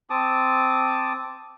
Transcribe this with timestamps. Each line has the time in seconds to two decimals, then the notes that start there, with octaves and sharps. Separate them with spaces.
0.10 C4 A5 D6 D#6